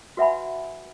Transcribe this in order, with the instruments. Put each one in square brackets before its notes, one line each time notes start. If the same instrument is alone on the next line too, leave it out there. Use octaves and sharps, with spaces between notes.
[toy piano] F#4 B4 E5 F#5 G#5 B5